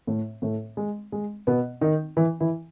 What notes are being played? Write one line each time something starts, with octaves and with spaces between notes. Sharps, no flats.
A2 A3
A2 A3
G#3
G#3
B2 B3
D#3 D#4
E3 E4
E3 E4